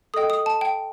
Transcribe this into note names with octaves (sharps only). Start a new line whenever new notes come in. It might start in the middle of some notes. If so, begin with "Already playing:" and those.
A4 D#5 G5 D#6
D#6
A5
G5